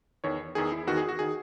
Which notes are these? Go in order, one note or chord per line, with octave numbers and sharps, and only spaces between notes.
E2 D#3 C#5
E2 D#3 G#4
E4
E2 D#3 F#4
G#4
F#4
D#3 G#4